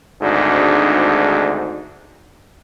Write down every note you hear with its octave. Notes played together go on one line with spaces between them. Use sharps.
G#1 D2 G#2 D4